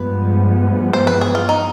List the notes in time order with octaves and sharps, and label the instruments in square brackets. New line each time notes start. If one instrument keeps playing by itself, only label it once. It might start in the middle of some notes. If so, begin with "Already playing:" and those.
Already playing: [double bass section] G2 F3 G#3 B3 [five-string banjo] B4
[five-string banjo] C5
B4
G#4
F4
D#4